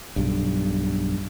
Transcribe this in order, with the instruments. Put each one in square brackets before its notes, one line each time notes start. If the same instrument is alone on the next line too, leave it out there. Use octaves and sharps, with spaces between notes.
[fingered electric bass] B1 G2